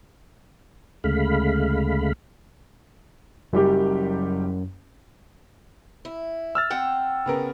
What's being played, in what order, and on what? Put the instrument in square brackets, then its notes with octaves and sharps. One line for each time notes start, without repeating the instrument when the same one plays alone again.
[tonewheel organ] D2 C#3 G#3 A3 F5 B5
[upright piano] F#1 G3 G4 [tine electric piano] F#2
[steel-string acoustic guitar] E4
[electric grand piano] E6 F6 A6
[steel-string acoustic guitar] C4 F#5 G5
[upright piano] C#3 B3 A#4